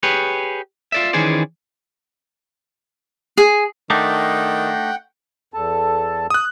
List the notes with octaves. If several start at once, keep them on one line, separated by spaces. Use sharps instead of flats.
G4 G#4 B4 C#5
F4 D5 E5
D#3 E3 C#4 G#4 C5 D5
G#4
D#3 A3 D4 D#4 F#5 G5
E2 A4 A5
D#6 F#6